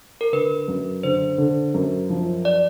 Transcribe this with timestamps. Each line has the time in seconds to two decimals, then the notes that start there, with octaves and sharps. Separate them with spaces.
0.21 A#4
0.33 D3 B4
0.68 F#2
1.03 D3 C5
1.38 D3
1.74 F#2
2.10 F3
2.45 D5